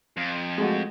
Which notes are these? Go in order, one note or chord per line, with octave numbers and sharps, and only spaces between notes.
F2
G#3 A3 F#4